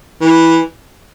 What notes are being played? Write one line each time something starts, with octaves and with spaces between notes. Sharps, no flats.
E3